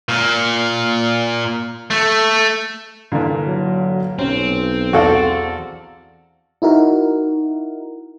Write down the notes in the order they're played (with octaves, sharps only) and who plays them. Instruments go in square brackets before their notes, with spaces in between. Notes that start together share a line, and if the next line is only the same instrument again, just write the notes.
[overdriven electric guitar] A#2
A3
[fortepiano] G2 A#2 [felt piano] D3 E3
[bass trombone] F#3
[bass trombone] B1 [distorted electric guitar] C4 [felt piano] C#4
[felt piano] E2 F5 [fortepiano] F#4 A4 D5
[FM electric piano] D#4 E4 F#4 A#4